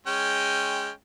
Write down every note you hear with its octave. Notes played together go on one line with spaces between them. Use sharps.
G#3 C#4 G5